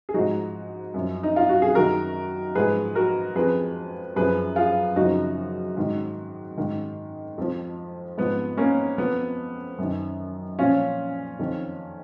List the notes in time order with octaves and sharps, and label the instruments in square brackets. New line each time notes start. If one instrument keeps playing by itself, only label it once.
[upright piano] G#4
G#2 F3 D#4 F#4
F#2 F3
D#4
F4
F#4
G#4
F#2 D#3 F#4 A#4
G#2 F3 G#4 B4
F#4 A#4
F2 F3 G#4 B4
F#2 F3 G#4 B4
F4 G#4
F#2 C#3 F3 D#4 F#4
G#2 D#3
G#2 D#3
F2 F3
G#2 F3 B3
A#3 C#4
F2 F3 B3
F#2 D#3
A#2 F3 C#4 F4
F2 D#3